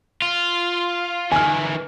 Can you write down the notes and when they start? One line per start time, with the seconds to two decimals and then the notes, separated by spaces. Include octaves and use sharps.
0.22 F4
1.32 D#3 E3 G#5 F6